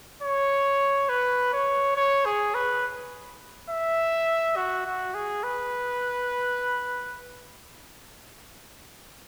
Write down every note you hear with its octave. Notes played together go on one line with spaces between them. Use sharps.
C#5
B4
C#5
C#5
G#4
B4
E5
F#4
F#4
G#4
B4